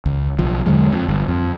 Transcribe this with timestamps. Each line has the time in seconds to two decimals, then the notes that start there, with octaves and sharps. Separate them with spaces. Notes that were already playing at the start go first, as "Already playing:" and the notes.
0.06 C#2
0.39 B1 F3
0.66 E2 D3 F#3 G#3
0.92 F2
1.08 G1
1.28 F2